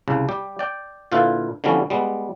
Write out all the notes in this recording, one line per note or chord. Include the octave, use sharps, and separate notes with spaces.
C2 C#3
G3 G4
D5 G5
A#2 D3 E4 F4 B4 F5
D3 E3 F3 G3 B3 C#4
G3 G#3 B3